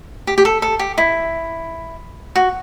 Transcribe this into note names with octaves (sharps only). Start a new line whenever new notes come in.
G4
G4
A4
A4
G4
E4
F#4